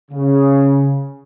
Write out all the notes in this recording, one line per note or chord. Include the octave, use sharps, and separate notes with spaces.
C#3